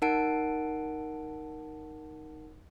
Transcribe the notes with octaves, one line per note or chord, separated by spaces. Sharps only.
D#4 A#4 F#5 A5 D7